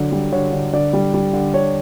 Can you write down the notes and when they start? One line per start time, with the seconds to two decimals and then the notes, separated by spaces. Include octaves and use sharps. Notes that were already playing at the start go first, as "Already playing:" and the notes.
Already playing: D3 F#3
0.12 G3
0.32 D3 C#5
0.53 D3
0.73 D3 D5
0.93 G3
1.14 G3
1.33 D3
1.54 D4 C#5